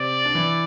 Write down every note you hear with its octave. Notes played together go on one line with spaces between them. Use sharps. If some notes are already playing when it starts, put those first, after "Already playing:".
Already playing: C3 C4 D5
D4
E3 E4